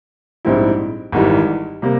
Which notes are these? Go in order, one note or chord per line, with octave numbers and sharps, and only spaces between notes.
A#1 G#2 G3 C4 E4
G#1 G#2 E3 G3
C3 G3 A#3